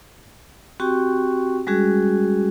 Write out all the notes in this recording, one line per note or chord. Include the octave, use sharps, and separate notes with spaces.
C4 F#4 G4 G5 C#6
G3 G#3 C#4 F#4 G#4